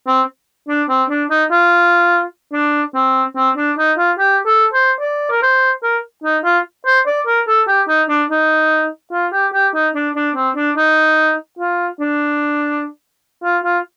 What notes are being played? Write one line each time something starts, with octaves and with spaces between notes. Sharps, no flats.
C4
D4
C4
D4
D#4
F4
D4
C4
C4
D4
D#4
F4
G4
A4
C5
D5
A#4
C5
A#4
D#4
F4
C5
D5
A#4
A4
G4
D#4
D4
D#4
F4
G4
G4
D#4
D4
D4
C4
D4
D#4
F4
D4
F4
F4